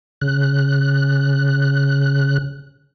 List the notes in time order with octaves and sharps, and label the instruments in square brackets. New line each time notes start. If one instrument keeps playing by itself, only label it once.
[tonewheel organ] C#3 F#6